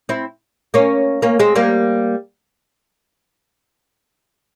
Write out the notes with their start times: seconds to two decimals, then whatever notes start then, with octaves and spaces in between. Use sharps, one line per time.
0.09 C4 E4
0.74 A#3 C#4
1.22 A#3 C#4
1.39 G#3 C4
1.56 G3 A#3